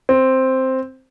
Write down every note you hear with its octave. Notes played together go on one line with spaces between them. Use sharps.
C4